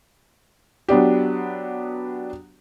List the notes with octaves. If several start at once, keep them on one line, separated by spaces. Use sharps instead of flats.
F#3 B3 D4 G4